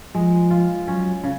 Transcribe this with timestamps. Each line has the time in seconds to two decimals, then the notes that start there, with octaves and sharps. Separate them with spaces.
0.15 F3 G#3
0.50 F4
0.87 F#3 C#4
1.24 C#3